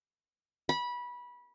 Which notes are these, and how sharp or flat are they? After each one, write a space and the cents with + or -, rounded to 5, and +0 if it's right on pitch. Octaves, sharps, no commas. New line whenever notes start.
B5 -20